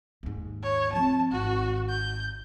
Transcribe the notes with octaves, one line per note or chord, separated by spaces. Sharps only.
D#2 G#2
C#5
F3 C4 A5
G#1 F#4
G6